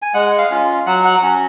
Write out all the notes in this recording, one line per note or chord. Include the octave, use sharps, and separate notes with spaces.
G#5
G#3 F#5
F5
C#4 F4
F#3 F#5
F#5
C#4 F#4